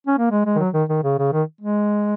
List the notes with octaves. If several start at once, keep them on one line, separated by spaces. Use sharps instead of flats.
C#4
A#3
G#3
G#3
D#3
F#3
D#3
D#3
C#3
C#3
D#3
G#3